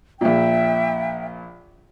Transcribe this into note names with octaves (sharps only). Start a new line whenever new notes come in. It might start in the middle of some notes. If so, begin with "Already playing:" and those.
A#1 A#2 E5 G5